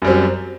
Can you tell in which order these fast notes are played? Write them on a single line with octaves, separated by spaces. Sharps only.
F#2 G3 C4 F#3